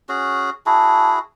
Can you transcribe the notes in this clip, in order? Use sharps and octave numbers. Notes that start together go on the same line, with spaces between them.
C#4 F#4 G#4
E4 F#4 G#4 A5